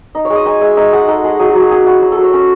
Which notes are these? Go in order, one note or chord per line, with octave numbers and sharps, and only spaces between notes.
D#4
C#5
G#3
D#5
D#4 G#5
G#3 E5
D#4 E5
G#3 F#5
D#4 A4
G#3 G#4
F#3 G#4
F#4
F#3 G#4
C#4 G#4
E4 F#4
F#3
A4
F#3
C#5
C#4